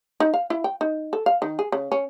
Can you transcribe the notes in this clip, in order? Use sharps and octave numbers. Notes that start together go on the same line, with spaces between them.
D#4
F5
E4
G5
D#4
A4
F5
D#3
G#4
C#3
C#4